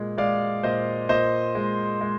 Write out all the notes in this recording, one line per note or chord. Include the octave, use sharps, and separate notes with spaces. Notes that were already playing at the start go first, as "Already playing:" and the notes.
Already playing: A#2 G#3
G#3 D5 F5
A#2 C5 D#5
A#2 C5 D#5
G#3
G#3